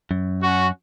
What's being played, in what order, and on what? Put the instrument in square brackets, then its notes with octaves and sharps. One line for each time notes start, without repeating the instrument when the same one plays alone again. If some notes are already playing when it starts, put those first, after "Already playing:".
[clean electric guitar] F#2
[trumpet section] C#4 F#4